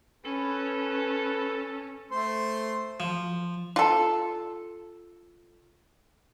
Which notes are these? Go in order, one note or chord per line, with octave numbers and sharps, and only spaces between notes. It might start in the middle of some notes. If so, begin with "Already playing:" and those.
C#4 A4 B4
A3 C5 C6
F3
F4 A4